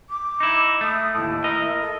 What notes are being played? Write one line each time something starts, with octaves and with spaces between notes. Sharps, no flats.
D6
D#4 E4
A3 D#6
D#2 A2 E4
A#4 D#5
A4